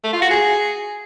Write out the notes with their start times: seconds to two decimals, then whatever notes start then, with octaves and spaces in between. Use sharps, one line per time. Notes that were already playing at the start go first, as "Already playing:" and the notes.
0.04 A3
0.13 F4
0.22 F#4
0.31 G#4